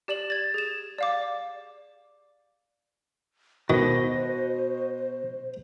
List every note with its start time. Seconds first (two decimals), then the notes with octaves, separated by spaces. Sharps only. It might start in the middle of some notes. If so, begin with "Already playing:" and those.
0.08 G4 D5 E7 F#7
0.30 G#6 A6
0.54 G#4 E7
0.98 D5 F5 D6
3.70 B2 D#3 F#4 C5 D#5